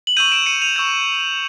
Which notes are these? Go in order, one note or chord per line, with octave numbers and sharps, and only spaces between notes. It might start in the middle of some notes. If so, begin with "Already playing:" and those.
F#7
C#6 E6 G6 D#7 F7
D7 E7
C#7 D#7
D#7 F7
C#6 E6 G6